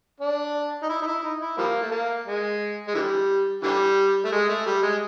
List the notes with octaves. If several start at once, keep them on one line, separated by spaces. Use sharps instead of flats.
D4
D#4
E4
D#4
E4
D#4
E4
F3 G3 A#3
A3
A#3
G#3
G#3
D3 E3 G3
D3 E3 G3
A3
G#3
A3
G3
G#3